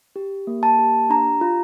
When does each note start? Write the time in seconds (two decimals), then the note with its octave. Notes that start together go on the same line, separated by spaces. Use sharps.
0.16 G4
0.47 A#3
0.63 A5
0.79 G4
1.10 D4 A#5
1.41 F4